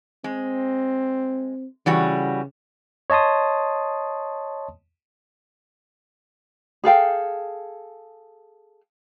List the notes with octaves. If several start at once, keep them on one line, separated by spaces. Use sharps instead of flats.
G#3 C4
C#3 E3 G3 F#4
C#5 D#5 A5 C6 D#6
G#4 A4 F5 G5